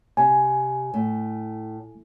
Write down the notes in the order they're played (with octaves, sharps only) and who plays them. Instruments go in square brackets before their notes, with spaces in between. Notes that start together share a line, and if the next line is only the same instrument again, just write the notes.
[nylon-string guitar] C3 [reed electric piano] G#5
[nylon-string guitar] A2